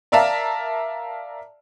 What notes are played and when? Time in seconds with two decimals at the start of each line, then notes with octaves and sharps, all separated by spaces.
0.12 A#4 D5 E5 F5 A5 A#5